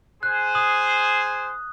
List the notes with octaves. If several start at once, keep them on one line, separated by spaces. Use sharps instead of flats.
G#4 C5 F#6
D#6 F#7